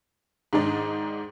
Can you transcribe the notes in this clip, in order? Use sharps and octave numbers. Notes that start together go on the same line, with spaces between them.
G#2 D#3 D4 D#4